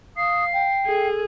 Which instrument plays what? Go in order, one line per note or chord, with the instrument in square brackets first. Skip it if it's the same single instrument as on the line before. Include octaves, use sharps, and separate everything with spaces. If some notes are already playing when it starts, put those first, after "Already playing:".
[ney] F5 [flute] D#6 [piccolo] C7
[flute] G5
[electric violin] G#4 [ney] A4